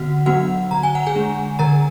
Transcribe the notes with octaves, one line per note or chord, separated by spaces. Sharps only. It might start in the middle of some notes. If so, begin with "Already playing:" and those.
Already playing: D3 B3 F#4 F#5
F#3 B3 D4 F#4 F#5
D3 A#5
G#5
F#5
G#4 G#5
G#3 D4
D3 A#4 A#5